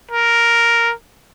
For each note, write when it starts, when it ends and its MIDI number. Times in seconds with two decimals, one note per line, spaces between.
0.11 0.93 70